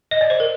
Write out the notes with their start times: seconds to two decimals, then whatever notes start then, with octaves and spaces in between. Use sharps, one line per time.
0.11 D#5
0.21 D5
0.30 C5
0.40 A#4